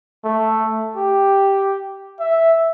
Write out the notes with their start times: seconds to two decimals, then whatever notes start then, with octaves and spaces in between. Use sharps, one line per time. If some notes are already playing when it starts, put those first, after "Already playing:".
0.25 A3
0.96 G4
2.20 E5